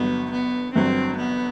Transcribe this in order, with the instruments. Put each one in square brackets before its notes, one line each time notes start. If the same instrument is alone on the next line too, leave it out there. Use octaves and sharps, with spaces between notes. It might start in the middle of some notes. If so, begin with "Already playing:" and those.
Already playing: [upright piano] G1 G2 F#3 [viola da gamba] B3
[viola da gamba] B3
[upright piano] G1 G2 F#3 [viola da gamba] C4
[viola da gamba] B3